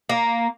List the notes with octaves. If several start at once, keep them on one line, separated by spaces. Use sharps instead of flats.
A#3